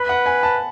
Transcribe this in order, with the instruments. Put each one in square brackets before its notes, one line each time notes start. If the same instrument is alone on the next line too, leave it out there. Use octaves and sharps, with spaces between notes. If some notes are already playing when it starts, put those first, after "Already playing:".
Already playing: [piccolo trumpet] B4 [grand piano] B5
[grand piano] F#5
G#5
A5